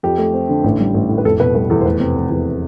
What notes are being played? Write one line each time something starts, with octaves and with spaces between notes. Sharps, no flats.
F2 G4
A3
C4
D3
A1
G3
A1
A2
B4
F1 A4
B2 B4
G3 B4
E2 A4
C5
F1 B4
C3
F1
E2